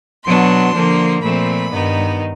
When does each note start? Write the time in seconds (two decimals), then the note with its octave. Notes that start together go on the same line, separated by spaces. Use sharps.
0.25 B2 F#3 B3 D4 C6
0.74 D3 F3 A#3
1.22 A#2 F3 A3 C4 B5
1.71 G2 D#3 G3 B3 D#4